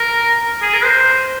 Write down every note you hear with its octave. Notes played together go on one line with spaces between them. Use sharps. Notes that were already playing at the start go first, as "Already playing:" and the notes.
Already playing: A#4
G#4
A#4
C5